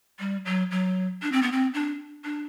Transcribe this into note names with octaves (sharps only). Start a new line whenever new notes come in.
G3
F#3
F#3
D4
C4
B3
C4
D4
D4